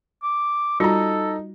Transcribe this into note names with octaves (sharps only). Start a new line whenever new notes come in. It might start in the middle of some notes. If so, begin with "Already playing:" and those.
D6
G3 D#4 F4 F#4 A4 A#5